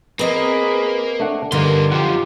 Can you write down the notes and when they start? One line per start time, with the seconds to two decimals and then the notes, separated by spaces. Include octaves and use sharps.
0.19 A#3 C4 G#4 B4 D#5
1.20 A3 D4 F#5
1.52 G2 D3 D#3 G3 A#3 C6
1.91 F#2 F3 F4 G4 F#5